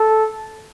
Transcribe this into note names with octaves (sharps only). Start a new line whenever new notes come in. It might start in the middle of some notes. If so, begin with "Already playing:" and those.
Already playing: A4